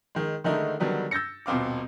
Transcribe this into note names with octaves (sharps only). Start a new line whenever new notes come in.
D#3 G#3
D3 D#3 G#3 A3 D#4 E4
D3 D#3 F#3 G3 B3
E6 G6 A6 A#6 C#7
D#1 B2 C4 F5 D6